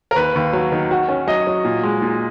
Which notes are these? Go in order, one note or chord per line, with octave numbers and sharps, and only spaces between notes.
A#4
D#2 B4
D#2
F#3
D#3
F#4
C#4
F#3 D#5
F#3
A#2
G#3
A#2